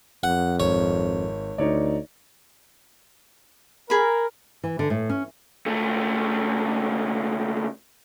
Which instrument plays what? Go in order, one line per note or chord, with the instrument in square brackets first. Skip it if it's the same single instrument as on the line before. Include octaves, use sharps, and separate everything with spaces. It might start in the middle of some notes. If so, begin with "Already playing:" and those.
[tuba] F2 [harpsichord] F#5
[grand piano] G#1 [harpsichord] C#5
[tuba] D2 [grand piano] D#4 C#5 D5
[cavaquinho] G#4 B5 [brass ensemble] A#4
[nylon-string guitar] E3
D3
A2
C#4
[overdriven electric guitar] C#2 A3